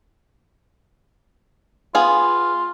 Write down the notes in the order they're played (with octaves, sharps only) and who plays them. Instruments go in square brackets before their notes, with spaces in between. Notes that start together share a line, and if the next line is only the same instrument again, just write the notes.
[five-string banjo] B3 G#4 F5 [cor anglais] F4